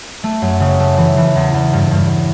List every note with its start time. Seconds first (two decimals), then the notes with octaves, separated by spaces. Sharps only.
0.23 A3
0.42 F#2
0.60 C#3
0.79 A3
0.98 E3
1.17 E3
1.35 E2
1.54 E2
1.73 G2
1.91 G2